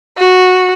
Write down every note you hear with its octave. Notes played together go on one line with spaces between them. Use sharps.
F#4